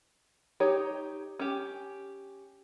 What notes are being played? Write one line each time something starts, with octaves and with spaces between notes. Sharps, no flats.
D#4 G4 C#5
C#4 G4